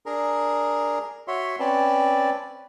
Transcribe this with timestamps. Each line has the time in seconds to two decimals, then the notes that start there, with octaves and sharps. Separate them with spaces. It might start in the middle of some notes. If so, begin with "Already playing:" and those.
0.06 D4 G#4 A#4 A#5
1.28 F#4 C#5 E5 C6
1.60 C4 C#4 B4 D5 A5